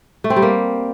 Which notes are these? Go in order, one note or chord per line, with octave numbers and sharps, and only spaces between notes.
A3
C4
G3
A#3